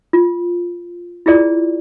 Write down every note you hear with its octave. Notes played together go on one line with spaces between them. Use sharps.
F4
E4 F4 G#4 D5